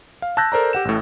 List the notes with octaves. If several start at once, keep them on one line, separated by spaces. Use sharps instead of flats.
F5
A5 E6 F#6 G6 A#6
A4 A#4 C5 D5 A#5
G4 F#5 E7
A1 A2